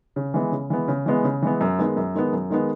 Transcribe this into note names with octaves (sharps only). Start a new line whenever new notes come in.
C#3
E3 G#3 B3
C#3
E3 G#3 B3
C#3
E3 G#3 B3
C#3
E3 G#3 B3
F#2
D#3 G#3 B3
F#2
D#3 G#3 B3
F#2
D#3 G#3 B3